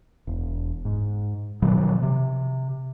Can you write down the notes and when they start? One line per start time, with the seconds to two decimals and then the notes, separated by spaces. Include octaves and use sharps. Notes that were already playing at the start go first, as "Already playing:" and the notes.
0.27 E1
0.85 G#2
1.62 B2 D#3 F3 F#3
2.02 C3